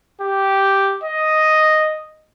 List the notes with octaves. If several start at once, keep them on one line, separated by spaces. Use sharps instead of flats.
G4
D#5